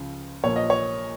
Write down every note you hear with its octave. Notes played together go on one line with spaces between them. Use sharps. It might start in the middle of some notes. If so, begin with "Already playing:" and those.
Already playing: C#2 C#3 F3
A#1 A#2 F3 C#5
D#5
C#5